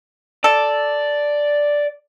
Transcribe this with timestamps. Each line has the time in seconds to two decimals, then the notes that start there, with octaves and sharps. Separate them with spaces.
0.44 A4 D5